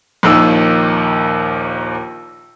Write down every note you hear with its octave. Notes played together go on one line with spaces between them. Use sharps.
A#1 D#2 D#3 A#3 E6